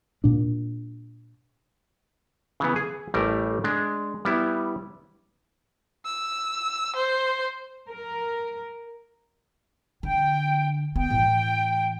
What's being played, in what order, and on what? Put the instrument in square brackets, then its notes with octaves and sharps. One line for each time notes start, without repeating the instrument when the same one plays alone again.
[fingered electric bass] A#2 D4
[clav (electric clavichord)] C#3 E3 B3
G#4
A1 G3 A3 A#4
G#3 D4
G3 B3 E4
[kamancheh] E6
C5
[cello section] A#4
[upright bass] D3 [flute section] G5
[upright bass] B3 [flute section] G5
[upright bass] A2 E3